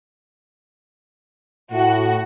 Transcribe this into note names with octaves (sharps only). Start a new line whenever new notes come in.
A2 F#4